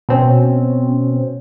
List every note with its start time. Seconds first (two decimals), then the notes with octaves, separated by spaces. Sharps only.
0.09 B2 C4 C#4